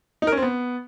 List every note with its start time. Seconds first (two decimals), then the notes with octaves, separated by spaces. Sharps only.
0.22 D#4
0.27 A#4
0.32 C#4
0.37 C4
0.42 B3